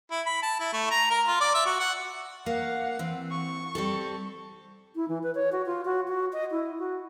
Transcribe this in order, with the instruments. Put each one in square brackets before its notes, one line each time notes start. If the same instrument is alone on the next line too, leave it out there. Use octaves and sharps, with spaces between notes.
[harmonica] E4
B5
A5
E4
A3
A#5
A#4
F4
D5
E5
F#4
F#5
[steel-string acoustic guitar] A#3 [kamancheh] F5 F#5
[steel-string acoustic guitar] E3 C4
[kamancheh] C#6
[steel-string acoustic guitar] G3 C4 A4
[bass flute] E4
E3
B4
C#5
F#4
F4
F#4
F#4
D#5
E4
F#4